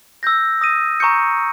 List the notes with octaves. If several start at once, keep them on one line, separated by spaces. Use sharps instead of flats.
E6 G6 A#6
D#6 A#6 D#7
A#5 C#6 G6 C#7